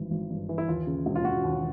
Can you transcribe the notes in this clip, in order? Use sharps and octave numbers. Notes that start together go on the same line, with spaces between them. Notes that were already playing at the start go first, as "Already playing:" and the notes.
Already playing: G#1 G2 E3
G#1
G2
E3
E4
D#2 F4
C#3
E1
F4
E1 F#4
D#2